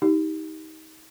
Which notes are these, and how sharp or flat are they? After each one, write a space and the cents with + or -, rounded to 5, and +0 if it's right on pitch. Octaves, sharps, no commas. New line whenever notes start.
D#4 +25 G4 +0